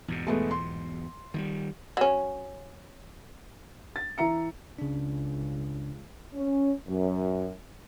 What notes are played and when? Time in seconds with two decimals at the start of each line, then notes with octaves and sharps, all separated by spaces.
0.08 E2 G#2 B2
0.27 G#3 A3 B3
0.51 C6
1.34 D#3 F#3 G3
1.97 F#3 C#4
3.96 A6
4.18 E3 E5 A#5 C#7
4.78 C#2 C#3 D4
6.34 C#4
6.87 F#2